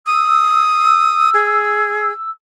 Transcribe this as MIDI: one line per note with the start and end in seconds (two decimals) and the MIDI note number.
0.06 1.30 87
0.06 2.30 88
1.34 2.12 68